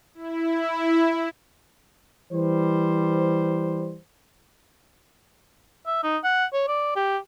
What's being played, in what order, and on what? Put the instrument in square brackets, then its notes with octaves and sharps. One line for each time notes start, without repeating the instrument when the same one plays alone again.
[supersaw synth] E4
[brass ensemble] E3 G3 C5
[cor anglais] E5
D#4
F#5
C#5
D5
G4